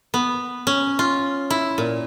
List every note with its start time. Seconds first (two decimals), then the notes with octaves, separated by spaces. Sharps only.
0.14 B3
0.67 C#4
0.99 F4
1.50 E4
1.78 A#2